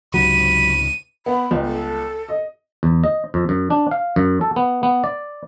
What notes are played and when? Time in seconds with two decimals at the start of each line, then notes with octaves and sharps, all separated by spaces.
0.14 C#2 G#2 C3 F#3 B5 D#7
1.26 B3 B5
1.51 G1 C#2
1.65 A4
2.29 D#5
2.83 E2
3.04 D#5
3.34 F2
3.49 F#2
3.70 D4
3.91 F5
4.16 F#2
4.41 A4
4.56 B3
4.83 B3
5.04 D5